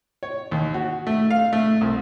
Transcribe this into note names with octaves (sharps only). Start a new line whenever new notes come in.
C#5
D#2
F#4
A3
F5
A3
C2